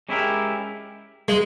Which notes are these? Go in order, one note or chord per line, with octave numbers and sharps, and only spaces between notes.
G#3 C#4 E4 G4 A#4
G#3